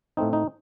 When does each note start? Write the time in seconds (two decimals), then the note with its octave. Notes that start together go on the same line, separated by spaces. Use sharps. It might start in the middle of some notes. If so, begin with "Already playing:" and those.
0.17 A2 A3 C4 D#4
0.33 D#4